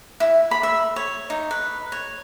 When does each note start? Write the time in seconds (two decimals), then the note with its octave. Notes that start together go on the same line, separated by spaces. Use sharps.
0.20 E4
0.51 B5
0.63 E5
0.96 C#5
1.30 D#4
1.51 B4
1.92 C#5